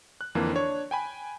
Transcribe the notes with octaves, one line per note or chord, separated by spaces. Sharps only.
F#6
F2 D3 E3 A#3
D4 C#5
G5 G#5 B5